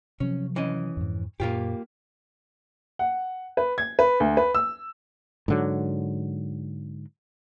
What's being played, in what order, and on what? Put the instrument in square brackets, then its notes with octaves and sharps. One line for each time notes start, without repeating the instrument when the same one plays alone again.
[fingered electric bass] C3 F3 F#3 [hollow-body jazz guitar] C#4
[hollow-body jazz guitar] E3 C#4 D#5
[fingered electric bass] F2 G#2
[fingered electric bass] F#2 A#2 [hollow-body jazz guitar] A#3 F4 G4
[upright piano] F#5
B4
G#6
B4
D2
B4
E6
[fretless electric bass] G#2 D3 F#3